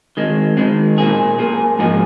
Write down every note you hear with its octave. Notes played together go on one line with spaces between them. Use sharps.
D#3 G#3 C4
D#3 G#3 C4
A#2 A#3 G#4
A#2 A#3 G#4
G#2 F3 A#3 D#4 G#4